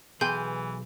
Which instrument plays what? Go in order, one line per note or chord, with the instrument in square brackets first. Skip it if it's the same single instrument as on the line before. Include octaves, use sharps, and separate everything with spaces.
[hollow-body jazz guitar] B1 G#4 G5 [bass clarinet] E3 [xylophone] G#5 C6 G6